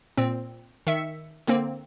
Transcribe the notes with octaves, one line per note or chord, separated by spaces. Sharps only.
A#2 C4
D#3 E5 C#7
D3 A#3 C4